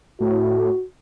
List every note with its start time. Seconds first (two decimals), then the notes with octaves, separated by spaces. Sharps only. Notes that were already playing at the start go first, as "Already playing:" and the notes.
0.21 A2 F#4